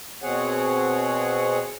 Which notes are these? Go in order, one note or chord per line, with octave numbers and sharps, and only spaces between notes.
B2 C4 G#4 C#5 F#5